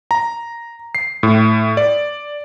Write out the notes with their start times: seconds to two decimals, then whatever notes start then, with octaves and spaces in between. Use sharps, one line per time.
0.11 A#5
0.95 C7
1.23 A2
1.77 D5